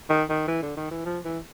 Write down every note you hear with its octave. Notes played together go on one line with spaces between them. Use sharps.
D#3
D#3
E3
D3
D#3
E3
F3
E3